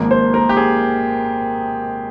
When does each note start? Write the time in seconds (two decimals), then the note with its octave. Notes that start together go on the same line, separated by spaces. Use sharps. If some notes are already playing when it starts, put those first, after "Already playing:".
Already playing: G#1 G#2 F3 A#3
0.11 C5
0.34 A#4
0.49 G4
0.57 G#4